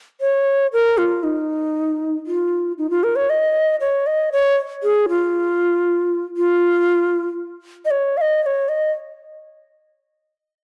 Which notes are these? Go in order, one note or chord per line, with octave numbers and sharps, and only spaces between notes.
C#5
A#4
F4
D#4
F4
D#4
F4
A#4
C#5
D#5
C#5
D#5
C#5
G#4
F4
F4
D#5
C#5
F5
D#5
D#5
C#5
D#5